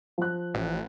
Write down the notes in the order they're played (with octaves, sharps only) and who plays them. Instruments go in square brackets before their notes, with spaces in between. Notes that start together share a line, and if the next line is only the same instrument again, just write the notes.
[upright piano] F3 F#6
[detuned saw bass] A1